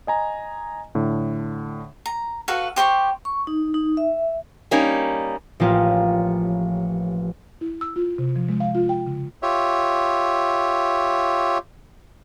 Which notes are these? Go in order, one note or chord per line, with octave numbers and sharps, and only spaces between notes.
D#5 G#5 A#5
A2 D3
A#5
F#4 A4 B4 F5
G4 C5 C6 C#6
C#6
D#4
D#4
E5
G3 A#3 C#4 D#4
A1 F3 A#3 C#4 F4 G4
E4
E6
F4
C3
F3
G#3
F5
F4
G5
C#3
F4 G4 C#5 E5